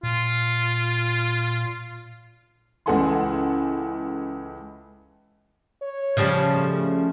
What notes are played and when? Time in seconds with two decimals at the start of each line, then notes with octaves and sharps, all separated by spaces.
0.03 A#2 F4
2.86 C#2 E3 A4 F#5 G#5 C6
5.82 C#5
6.17 C#3 F3 G3
6.57 A3